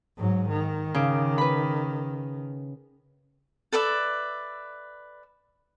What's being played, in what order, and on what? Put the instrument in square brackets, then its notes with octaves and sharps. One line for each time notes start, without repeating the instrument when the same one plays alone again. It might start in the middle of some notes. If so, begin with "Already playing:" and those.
[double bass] G#2 F#3
D#3
[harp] C#3 D6
B4 B5
[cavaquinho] A4 B4 D5 E5